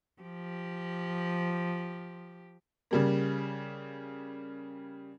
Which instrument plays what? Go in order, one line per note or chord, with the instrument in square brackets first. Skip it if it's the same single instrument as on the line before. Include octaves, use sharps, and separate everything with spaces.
[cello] F3 G4
[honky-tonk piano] C#3 G3 A#3